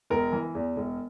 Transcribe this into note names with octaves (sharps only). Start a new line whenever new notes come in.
E1 A#4
E3
E2
E1